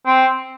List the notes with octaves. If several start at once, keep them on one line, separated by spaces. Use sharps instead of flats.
C4